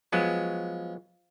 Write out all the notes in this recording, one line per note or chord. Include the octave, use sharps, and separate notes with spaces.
F3 F#3 G#3 B3